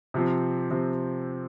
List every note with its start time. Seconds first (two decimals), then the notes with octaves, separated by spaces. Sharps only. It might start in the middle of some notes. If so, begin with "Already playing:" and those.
0.14 C3 F3 C4
0.70 C3 F3 C4